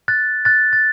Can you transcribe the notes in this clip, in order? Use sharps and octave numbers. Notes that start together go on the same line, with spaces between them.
F#6 A6
F#6 A6
A6